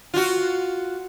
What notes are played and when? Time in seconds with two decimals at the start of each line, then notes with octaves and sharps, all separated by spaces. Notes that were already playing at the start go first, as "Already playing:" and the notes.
0.14 F4 F#4